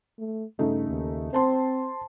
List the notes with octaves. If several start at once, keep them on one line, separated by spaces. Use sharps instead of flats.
A3
G2 C#3 A3 D#4
D#2
C4 C5 A5 C6